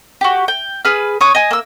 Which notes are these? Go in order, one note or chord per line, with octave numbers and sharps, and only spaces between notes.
F#4 G4
G5
G#4 B4 F6
C#5 C#6 D#6 F#6
D#5 G#5
A#3 E6